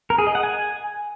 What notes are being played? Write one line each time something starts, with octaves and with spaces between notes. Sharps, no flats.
A#4
G#4
D#5
F#5
G#5